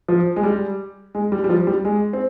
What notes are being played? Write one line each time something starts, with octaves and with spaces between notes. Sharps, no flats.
F3
G#3
G3
G#3
G3
G3
F3
G3
G#3
C4